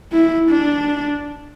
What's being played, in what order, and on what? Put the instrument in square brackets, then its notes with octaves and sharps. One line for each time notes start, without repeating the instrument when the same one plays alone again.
[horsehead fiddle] E4
D4